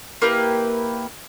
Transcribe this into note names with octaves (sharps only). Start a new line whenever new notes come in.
A#3 E4 G4 B4